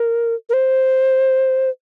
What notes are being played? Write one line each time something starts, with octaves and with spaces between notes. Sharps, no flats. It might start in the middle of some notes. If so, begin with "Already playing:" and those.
Already playing: A#4
A#4
C5